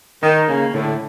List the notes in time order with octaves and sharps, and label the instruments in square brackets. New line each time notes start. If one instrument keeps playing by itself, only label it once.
[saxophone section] D#3 [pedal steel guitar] D#4
[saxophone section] C#3 [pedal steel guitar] A#3
[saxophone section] A2 [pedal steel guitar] D3